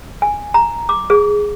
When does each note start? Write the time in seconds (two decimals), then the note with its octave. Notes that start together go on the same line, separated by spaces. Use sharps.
0.22 G#5
0.54 A#5
0.89 D6
1.10 G#4